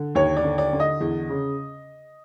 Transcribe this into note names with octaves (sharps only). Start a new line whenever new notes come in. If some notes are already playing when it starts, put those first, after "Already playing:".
Already playing: D3
D#2 C#5
D5
D3
D5
D3
D#5
E2
C#3